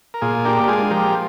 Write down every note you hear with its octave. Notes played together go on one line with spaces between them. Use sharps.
A#4
A#2 F4 G#4
D4 G4 A#4
A#4
G#3 F4 G#4
F3 G4 A#4